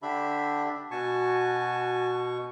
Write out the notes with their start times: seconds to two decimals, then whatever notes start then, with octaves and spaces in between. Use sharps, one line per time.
0.02 D3 D4 G4 E5 B5
0.91 B2 F#4 G#5 A5 C#6